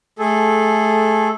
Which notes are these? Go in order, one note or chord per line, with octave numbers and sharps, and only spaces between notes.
A3 G#4 A4